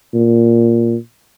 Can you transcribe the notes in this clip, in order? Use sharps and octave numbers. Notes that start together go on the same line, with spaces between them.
A#2